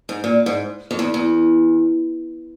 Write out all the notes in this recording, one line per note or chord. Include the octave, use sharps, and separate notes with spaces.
G#2
A#2
G#2
F2
E2
E2